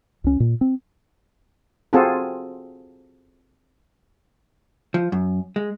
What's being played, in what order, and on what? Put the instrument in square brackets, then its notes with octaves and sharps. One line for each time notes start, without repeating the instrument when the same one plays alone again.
[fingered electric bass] C#2 C#4
A#2
C4
[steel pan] C4 F4 F#4 G#4 A4
[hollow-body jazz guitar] F3
F#2
G#3